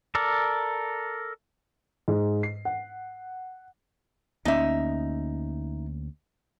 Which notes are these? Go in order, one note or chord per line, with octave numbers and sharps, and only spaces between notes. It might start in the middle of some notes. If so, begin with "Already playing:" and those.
A4 A#4 D5
G#2
C7
F#5
D2 A#3 C#4 D#4 E5